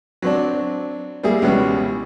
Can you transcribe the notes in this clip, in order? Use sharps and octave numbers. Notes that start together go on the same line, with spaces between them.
F#3 C4 D4
G3 A#3 E4 G#4
C#2 B2 E3 G3 C#4